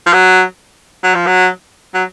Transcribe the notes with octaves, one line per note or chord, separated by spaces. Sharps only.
F3
F#3
F#3
F3
F#3
F#3